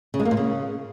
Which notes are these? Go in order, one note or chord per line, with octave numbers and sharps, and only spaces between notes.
C#3
G#3
A#3
A#2
C#3